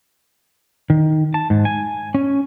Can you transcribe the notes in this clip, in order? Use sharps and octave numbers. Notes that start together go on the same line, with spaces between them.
D#3
A5
G#2
G#5
C#4